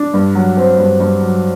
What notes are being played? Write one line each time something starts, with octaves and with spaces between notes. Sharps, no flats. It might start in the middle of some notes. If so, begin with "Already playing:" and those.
Already playing: D4
G2
F#3
C4
G2
G2
F#3